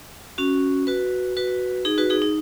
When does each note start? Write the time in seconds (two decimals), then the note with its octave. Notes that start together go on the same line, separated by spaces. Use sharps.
0.38 C#4 F#4
0.87 F#4 B4
1.37 F#4 B4
1.85 D#4 G#4
1.98 F#4 B4
2.10 D#4 G#4
2.22 D#4